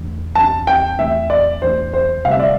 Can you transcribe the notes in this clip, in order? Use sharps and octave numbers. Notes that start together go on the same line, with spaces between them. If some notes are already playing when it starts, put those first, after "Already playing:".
Already playing: E2 E3 A3 D4
E2 E3 A3 D4 A5
G5
E2 E3 A3 D4 E5
D5
E2 E3 A3 D4 C5
C5
D2 C3 G3 F5
E5
D5